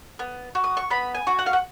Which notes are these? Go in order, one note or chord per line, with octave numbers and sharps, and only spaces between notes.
B3
F#4
D#6
C#6
B3 B5
G#5
F#4
F#5
F5
F#5